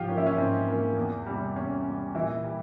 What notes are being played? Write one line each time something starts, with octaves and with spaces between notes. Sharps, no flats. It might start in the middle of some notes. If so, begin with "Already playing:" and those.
Already playing: G#2 F3 F4 G4
E3 A#3 C#4
E4
C#4
G#2 C4
E3 A#3
E2
C3 G3
E2 C#4
C3 G3
A#2 E3 E4
G3